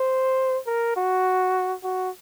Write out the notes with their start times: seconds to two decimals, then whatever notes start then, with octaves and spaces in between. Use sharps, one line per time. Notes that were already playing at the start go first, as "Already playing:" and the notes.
Already playing: C5
0.67 A#4
0.96 F#4
1.84 F#4